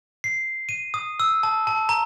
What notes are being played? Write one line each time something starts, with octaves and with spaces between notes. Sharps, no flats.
C7
D#7
D#6
E6
A5
A5
A#5